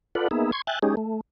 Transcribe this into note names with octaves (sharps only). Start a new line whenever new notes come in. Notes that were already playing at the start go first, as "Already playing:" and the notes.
F4 A4 B4 D5 F#5
A#3 B3 D#4 G#4 E5
C6 C#6 G#6
E5 G5 G#5 F#6 A6
G#3 C#4 D#4 G4 G#4
A3